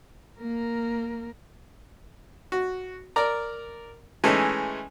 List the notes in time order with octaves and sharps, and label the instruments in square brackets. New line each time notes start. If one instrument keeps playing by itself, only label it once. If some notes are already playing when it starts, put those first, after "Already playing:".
[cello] A#3 A#4
[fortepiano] F#4
A#4 D5 A#5
E3 G#3 A3 C#4 D#4